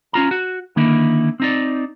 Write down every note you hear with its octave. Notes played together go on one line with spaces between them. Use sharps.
C#4 F4 A#5
F#4
D3 D#3 A#3 D#4 E4
C4 D#4 D5